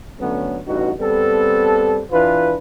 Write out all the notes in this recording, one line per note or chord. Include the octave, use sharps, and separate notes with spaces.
D3 F#3 A3 B3 C#4
A1 G2 D#4 F#4
G3 B3 C4 A4
E3 D4 F4 B4